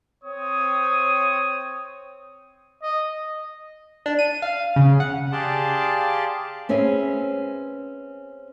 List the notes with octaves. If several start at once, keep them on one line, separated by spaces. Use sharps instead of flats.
C4 C#5 D#6
D#5
D4
D#7
F5
C#3
F#5
G4 G#4 D5 F5 A5 C6
C4 C#4 G#4 B4 E5